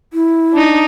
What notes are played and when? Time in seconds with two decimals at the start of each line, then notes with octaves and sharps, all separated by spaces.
0.13 E4
0.54 D4 D#4